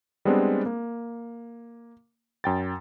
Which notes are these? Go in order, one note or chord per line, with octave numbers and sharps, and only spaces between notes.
G3 G#3 B3 C4 D4
A#3
F#2 G5 A6